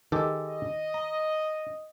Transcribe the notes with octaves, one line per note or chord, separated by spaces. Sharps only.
D#3 G#3 G4 A4
D#5
A#5